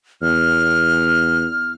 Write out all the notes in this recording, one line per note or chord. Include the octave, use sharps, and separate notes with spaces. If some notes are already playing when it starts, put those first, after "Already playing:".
E2 F6